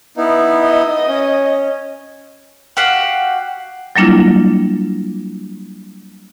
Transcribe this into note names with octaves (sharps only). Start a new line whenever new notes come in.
B3 D#4 E4
D#5
C#4
F#4 G4 F5 F#5
F#3 G3 A#3 D4 E4 F4